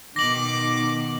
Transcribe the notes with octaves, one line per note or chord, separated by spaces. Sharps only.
B2 D#3 D6 A#6 F#7